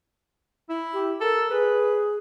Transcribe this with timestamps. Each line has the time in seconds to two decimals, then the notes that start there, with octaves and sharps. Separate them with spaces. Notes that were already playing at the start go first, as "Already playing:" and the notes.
0.69 E4
0.93 G4
1.21 A4 A#4
1.51 G#4 B4